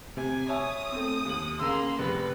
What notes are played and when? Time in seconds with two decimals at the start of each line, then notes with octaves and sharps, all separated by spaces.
0.17 C3 G#5
0.49 C#5 E5 G#5 D#6
0.92 A3 C4
1.25 D#2 F#7
1.59 C#3 A#3 C6 E6
1.99 F1 B4